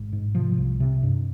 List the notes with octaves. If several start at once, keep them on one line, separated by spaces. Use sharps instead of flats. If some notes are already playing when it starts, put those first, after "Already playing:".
Already playing: G#1
G#2
C3 F3
C2
C3
G2